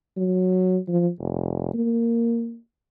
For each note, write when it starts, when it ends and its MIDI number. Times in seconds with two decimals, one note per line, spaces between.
0.17 0.78 54
0.88 1.09 53
1.19 1.72 29
1.74 2.57 58